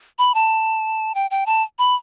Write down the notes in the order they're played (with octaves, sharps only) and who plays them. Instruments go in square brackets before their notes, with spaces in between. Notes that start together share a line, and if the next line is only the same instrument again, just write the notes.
[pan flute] B5
A5
G5
G5
A5
B5